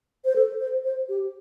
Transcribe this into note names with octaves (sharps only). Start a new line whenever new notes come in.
C5
A4
C5
C5
G4